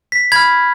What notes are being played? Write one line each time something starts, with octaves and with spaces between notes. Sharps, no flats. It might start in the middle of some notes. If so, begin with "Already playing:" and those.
B6
B5 F6 G#6